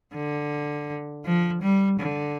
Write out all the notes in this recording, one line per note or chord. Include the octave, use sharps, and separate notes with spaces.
D3
F3
G3
D3